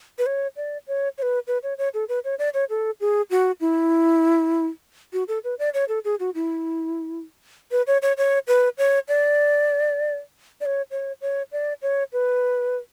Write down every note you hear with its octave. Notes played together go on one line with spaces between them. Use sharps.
B4
C#5
D5
C#5
C#5
B4
B4
C#5
C#5
A4
B4
C#5
D5
C#5
A4
G#4
F#4
E4
F#4
A4
B4
D5
C#5
A4
G#4
F#4
E4
B4
C#5
C#5
C#5
B4
C#5
D5
D5
C#5
C#5
C#5
D5
C#5
B4